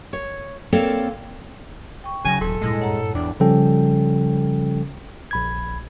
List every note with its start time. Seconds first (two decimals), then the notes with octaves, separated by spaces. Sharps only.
0.13 C#5
0.72 A#3 C4 A4 C#5 D5 F5
2.04 G5 C#6
2.25 D#2 C#3 F#3 G#5 A#6
2.41 D#1 G#2 A4
2.62 D2 G2 A#2 G#3 E4 A#6
2.79 C#5 F#5 A#5
3.15 E2 D4 G5
3.40 C#3 F3 G3 C#4 A4 G5
5.31 A#1 B5 G#6